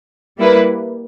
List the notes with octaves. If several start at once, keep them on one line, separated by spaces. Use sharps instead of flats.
G3 A#3 E4 B4